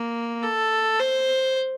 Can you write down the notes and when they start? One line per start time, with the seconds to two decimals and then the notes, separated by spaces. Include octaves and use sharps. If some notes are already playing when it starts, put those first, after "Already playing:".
Already playing: A#3
0.43 A4
1.00 C5